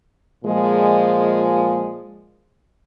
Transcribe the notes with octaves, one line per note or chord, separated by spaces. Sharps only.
A#2 F3 G#3